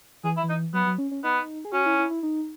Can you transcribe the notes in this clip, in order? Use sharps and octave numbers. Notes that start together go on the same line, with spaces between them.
E3 G#4
E4
E3
D#4
F#3 B3
F#3
C#4
C#4
B3 D#4
G#4
C#4 F#4
E4
E4
E4
D#4